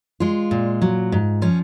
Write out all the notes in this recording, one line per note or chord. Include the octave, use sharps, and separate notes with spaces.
G#3 F4
A#2
F#3
G#2
F3 C#4